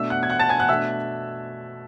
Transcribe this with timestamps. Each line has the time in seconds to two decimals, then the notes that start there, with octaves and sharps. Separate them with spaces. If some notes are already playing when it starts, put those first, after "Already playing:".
Already playing: B2 A3 D4 E5 E6
0.10 F#5 F#6
0.23 G#6
0.30 F#5 F#6
0.39 A5 A6
0.49 G#5 G#6
0.59 F#5 F#6
0.69 B2 A3 D4 E5 E6